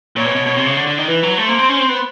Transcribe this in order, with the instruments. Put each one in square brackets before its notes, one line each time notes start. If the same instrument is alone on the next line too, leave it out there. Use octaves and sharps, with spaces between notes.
[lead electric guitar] A#2 [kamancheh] C#5
[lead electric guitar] B2
B2
B2
C3
C#3
D3
D3
D#3
[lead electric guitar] E3 [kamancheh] B4
[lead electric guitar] F#3
[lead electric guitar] A3 [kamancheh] C5
[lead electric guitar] A#3
C4
C#4
C4
B3